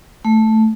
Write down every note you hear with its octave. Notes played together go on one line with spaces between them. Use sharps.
A3